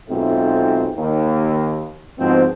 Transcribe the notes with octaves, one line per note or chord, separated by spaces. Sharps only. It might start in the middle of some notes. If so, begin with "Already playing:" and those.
B1 G#2 C4 F4 A4 E5
D#2
G#2 B2 F3 B3 C4